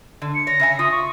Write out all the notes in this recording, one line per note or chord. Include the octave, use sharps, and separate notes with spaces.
D3
C#7
C#5 A#6
C#3 E5 G#5
F4 D#6
C#6